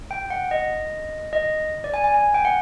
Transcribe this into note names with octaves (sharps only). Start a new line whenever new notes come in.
G5
F#5
D#5
D#5
D5
G#5
G#5
G#5
G5
F#5